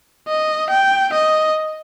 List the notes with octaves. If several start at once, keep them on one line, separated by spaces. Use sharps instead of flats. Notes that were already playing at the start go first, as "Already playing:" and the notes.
D#5
G5
D#5